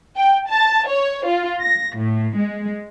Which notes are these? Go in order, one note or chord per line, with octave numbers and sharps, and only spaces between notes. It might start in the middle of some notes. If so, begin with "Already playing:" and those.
G5
A5
C#5
F4
A#6
A2
G#3